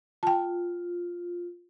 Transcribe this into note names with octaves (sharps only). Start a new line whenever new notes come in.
F4 G5 A5